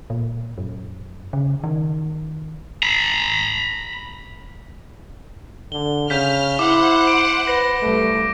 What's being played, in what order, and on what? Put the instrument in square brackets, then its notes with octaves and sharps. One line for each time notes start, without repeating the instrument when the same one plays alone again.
[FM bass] A#2
F#2
C#3
D#3
[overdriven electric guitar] A#5 B5
[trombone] D3 [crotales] G7
[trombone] C#3 [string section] F6 [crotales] G6 B6
[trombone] E4 [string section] C5 F#5 [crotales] D6
[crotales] D7
[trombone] B4 [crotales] A#6
[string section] C2 [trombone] A3